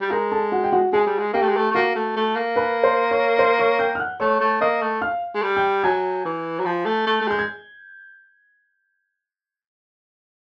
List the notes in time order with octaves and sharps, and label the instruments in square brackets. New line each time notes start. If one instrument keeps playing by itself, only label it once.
[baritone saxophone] G3
[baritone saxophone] G#3 [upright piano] A#4 A#5
[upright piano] A4 A5
F#4 F#5
G5
F#4 F#5
[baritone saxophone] G#3 [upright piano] G#4 G#5
[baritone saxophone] G3
G#3
[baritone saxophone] A#3 [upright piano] G4 G5
[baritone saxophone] A3
G#3
A3
A3
[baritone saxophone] A#3 [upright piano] F#4 F#5
[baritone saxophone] A3
A3
A#3
[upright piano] B4 B5
C5 C6
C#5 C#6
C5 C6
C#5 C#6
G5 G6
F6
F#5 F#6
[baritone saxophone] A3 [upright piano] C#5 C#6
[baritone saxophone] A3
[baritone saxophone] A#3 [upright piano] D#5 D#6
[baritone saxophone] A3
[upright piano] F5 F6
[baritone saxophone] G#3
G3
[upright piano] G5 G6
[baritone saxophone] F#3 [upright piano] G#5 G#6
[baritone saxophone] E3
F#3
F3
A3
A3
A3
[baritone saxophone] G#3 [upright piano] G6
[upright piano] G#6